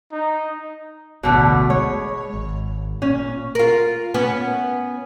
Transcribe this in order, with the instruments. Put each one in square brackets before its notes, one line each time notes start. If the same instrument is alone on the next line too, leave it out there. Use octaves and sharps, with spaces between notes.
[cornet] D#4
[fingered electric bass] E1 A1 D2 [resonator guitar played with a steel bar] B2 D3 A3
[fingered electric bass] G#3 [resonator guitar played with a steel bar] C#5
[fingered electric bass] G#1
[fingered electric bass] A#2 [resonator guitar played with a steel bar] C#4
[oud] F4 A#4
B3 C#4